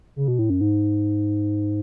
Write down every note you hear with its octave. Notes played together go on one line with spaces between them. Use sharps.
C#3
B2
A2
F#2
G#2